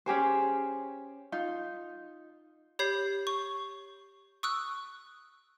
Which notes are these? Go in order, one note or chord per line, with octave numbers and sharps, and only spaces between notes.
C#4 G4 G#4 C5
D#4 F4
G4 C#5 B5 G6 C7
C#6
C#6 D#6 E6 F#6